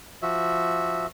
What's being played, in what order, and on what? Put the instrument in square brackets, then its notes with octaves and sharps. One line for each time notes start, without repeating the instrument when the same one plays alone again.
[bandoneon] F3 F#4 E5